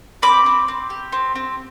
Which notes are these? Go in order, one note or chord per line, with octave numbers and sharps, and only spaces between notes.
C4 B5 D6
C4
C4
G4
C4
C4